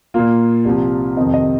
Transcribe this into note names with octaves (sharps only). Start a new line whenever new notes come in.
A#2 A#3 F4
C2 C3 F3
F2 C3 D#3 C4 D#5
D#5